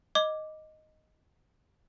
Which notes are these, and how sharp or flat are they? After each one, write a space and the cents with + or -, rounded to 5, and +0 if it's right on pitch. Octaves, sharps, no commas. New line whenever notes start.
D#5 +0 D6 +0